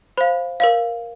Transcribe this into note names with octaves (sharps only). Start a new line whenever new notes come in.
C5 F5 B5
A#4 C#5 F5